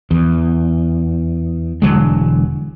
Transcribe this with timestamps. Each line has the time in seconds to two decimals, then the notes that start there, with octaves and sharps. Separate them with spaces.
0.11 E2
1.82 E1 D3 F#3 G#3